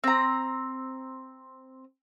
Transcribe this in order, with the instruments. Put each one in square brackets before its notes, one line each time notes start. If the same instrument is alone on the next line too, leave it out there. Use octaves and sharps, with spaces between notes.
[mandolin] C4 A#5